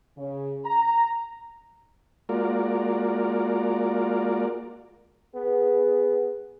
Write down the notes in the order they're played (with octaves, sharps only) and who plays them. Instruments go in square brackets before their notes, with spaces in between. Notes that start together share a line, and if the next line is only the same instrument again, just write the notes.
[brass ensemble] C#3
A#5
[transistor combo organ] G#3 A#3 F4 F#4 A#4 D5
[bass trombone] B3 [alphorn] G#4